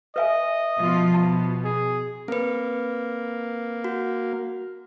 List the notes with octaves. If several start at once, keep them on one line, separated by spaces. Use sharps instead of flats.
B4 D#5 E5 G#5
B2 F3 F4
B2 A5
G#4
A#3 C4 B4
F#4